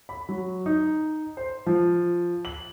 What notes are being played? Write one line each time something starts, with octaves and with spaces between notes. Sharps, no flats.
B5
F#3
D#4
C5
F3
F#7